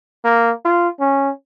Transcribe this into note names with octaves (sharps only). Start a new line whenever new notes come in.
A#3
F4
C#4